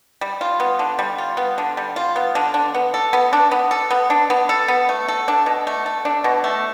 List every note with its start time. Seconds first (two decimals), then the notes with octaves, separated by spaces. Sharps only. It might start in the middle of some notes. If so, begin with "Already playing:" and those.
0.21 G3
0.41 F4
0.60 B3
0.79 D3
0.99 G3
1.18 F4
1.37 B3
1.58 D3
1.77 G3
1.96 F4
2.16 B3
2.35 D3
2.54 D4
2.74 B3
2.94 A4
3.13 B3
3.33 D4
3.51 B3
3.71 A4
3.91 B3
4.10 D4
4.30 B3
4.49 A4
4.68 B3
4.89 A3
5.08 A4
5.28 D4
5.46 B2
5.67 A3
5.86 A4
6.05 D4
6.24 B2
6.44 A3